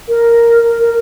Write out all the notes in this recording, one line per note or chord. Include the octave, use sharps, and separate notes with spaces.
A#4
A#4